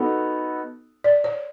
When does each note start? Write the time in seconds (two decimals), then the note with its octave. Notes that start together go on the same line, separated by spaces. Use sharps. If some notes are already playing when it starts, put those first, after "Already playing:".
Already playing: B3 D#4 F#4 A4
1.04 D5
1.24 C#5